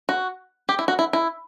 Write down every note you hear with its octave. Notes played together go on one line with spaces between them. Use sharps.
F#4
G4
E4
F#4
E4
E4